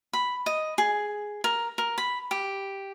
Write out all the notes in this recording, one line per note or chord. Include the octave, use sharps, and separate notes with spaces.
B5
D#5
G#4
A#4
A#4
B5
G4